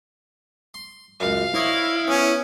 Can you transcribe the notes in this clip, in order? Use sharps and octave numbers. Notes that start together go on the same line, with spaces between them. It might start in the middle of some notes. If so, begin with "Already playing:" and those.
C6
C#2 F#2 F5
E4 C5 C#5 D#5
B3 C#4